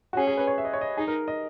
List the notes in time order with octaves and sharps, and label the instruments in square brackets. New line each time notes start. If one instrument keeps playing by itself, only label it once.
[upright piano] F#4
[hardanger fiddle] C#4 [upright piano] G#4
[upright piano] G#4
B4
C#5
E5
D#5
C#5
D#5
[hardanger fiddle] D#4 [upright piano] G#4
[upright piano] A#4
D#5